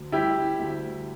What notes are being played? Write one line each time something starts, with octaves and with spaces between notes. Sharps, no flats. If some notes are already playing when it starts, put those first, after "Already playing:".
Already playing: D2
G3 E4 G4
D2